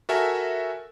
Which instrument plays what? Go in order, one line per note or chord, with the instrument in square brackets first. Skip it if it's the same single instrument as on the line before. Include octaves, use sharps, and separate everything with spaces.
[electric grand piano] F#4 A4 A#4 E5 G#5